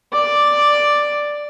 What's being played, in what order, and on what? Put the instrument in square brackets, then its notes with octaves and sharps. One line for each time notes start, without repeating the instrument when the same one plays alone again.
[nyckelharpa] D5